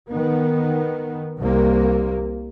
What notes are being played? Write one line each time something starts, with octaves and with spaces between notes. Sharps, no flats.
D#3 B3
C2 C3 A#3